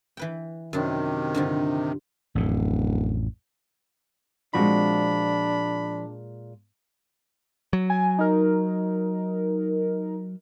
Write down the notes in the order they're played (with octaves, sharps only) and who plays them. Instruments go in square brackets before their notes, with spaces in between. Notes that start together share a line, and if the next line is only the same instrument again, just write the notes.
[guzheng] E3 B4 G5
[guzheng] F#2 D4 [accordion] C3 D#3
[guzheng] G2 D3 F3
[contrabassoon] D1 [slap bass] A1 F2 A2
[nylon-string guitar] A#2 G#3 [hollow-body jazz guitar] F3 C4 F#4 [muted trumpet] D4 [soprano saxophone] B5
[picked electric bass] F#3
[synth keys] G#5
D#4 A#4